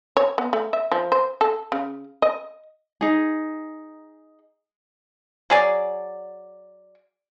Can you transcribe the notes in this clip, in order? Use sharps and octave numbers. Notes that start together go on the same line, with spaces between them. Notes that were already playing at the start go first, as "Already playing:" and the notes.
C#5
B3
A3
E5
F3
C5
A4
C#3
D#5
D#4 G#4
F#3 G#4 D5